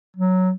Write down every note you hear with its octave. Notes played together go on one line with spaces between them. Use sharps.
F#3